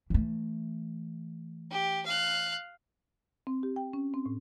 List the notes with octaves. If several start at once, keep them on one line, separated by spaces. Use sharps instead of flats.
E3 A3
G4
F5 F#6
C4
G4
G5
C#4
C4
A2